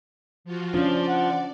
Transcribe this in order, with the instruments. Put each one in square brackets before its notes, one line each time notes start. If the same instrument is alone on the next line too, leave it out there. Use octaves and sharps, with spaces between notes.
[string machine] F3 F4 F#4
[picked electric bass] F3 [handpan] C#4 D4 [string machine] D5
[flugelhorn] F#5